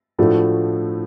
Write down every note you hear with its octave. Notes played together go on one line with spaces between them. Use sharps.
A2 F3 A3 D4 F#4